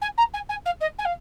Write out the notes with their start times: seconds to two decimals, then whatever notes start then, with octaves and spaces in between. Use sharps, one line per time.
0.01 G#5
0.17 A#5
0.33 G#5
0.49 G#5
0.65 F5
0.80 D#5
0.98 G#5
1.05 F5